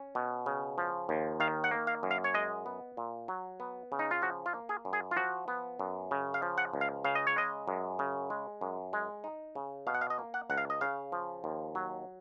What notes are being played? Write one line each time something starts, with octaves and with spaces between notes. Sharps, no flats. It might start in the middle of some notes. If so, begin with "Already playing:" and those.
Already playing: C#4
B2
C#3
F3
D#2
D#3 F5
F#5
A#3
F5
F#2
F5
C#5
G#3 D#5
B3
A#2
F#3
B3
C#3
D#4
F4
F3 F#4
F4
A#3
G#4
F#2
G#4
F4
F3 F#4
B3
F#2
C#3
F5
F3
F#5
C#2
F5
C#3 F5
D#5
C#5
G#3 D#5
F#2
C#3
G#3
F#2
G#3
D#4
C#3
B2 F5
F#5
F5
D#5
A#3
F#5
C#2 F#5
F5
D#5
C#3 F5
F3
D#2
F#3